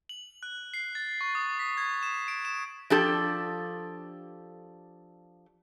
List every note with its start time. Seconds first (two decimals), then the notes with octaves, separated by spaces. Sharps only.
0.09 F#7
0.43 F#6
0.74 C7
0.95 A6
1.21 C#6
1.35 D#6
1.59 B6
1.77 G#6
2.03 E7
2.28 D7
2.45 E7
2.90 F3 D4 G4 A4